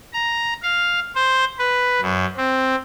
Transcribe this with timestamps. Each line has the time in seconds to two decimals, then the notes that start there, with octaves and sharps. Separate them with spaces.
0.13 A#5
0.63 F5
1.15 C5
1.59 B4
2.02 F#2
2.37 C4